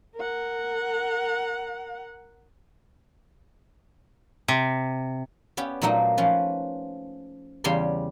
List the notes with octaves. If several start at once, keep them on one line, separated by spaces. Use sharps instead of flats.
A#4 F#5
C3
B3 C#4 G4
A#2 F#3 A3 A#3 D#4
F3 C#4 B4
E2 C#3 G3 G4 C6